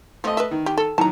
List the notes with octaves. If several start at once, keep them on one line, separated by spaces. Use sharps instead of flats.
F3 A3 D#5
B4 E5
D#3
G4
A4
A2 D#3 F#3 A5 A#5